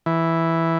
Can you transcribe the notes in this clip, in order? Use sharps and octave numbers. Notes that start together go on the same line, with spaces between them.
E3